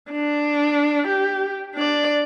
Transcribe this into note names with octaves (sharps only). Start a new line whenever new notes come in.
D4
G4
D4 D5